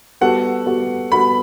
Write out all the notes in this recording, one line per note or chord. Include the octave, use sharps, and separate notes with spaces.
G3 B3 F#4 A4 F#5
G3 B3 F#4 A4
G3 B3 F#4 A4 B5